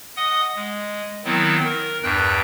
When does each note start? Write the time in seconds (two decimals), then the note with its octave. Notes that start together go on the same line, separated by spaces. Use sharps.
0.17 D#5 F#5 D#6
0.56 G#3
1.25 D#3 F#3 B3 C4 E4
1.64 A#4
2.03 E2 G2 G5 F#6